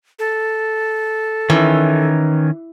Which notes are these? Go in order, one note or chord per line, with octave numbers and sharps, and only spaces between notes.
A4
D#3 E3 C#4